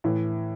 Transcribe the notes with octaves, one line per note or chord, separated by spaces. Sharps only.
A2 E3